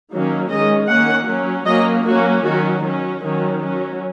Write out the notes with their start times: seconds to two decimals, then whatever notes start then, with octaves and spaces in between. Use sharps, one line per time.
0.12 D#3 F#3 A#3 C#4
0.51 D#3 G#3 C#4 D#5
0.90 D#3 A#3 C#4 F#5
1.28 F#3 C#4
1.67 F#3 A#3 C#4 D#5
2.05 F#3 A#3 C#4 F#4
2.44 D#3 F#3 C#4 F#4
2.83 F#3 C#4
3.21 D#3 F#3 C#4
3.60 F#3 C#4